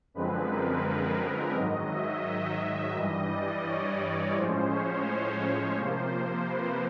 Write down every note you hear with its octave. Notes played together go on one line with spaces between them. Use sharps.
F#2 D3 F3 G#3 C4 B4
A#4
G#2 D#3 F#3 D#5
E5
G2 E3 G3 D#5
D5
C#5
A2 F3 G#3 C#4 C5
C#5
C#5
C3 F3 A#3 C5
B4